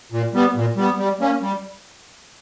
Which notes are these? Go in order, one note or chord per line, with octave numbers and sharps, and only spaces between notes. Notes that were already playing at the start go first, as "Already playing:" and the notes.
A#2
G3 B3
A#2
G3 B3
G3
A#3 C#4
G3